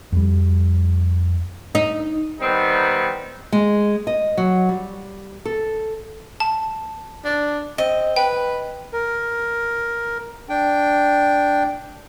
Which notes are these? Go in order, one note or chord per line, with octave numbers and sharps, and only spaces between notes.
F2 G3
D#4
D#3 G3 B3 C4 D#4
G#3
D#5
F#3
G3
A4
A5
D4
C4 D#5
B4 G5
A#4
D4 G5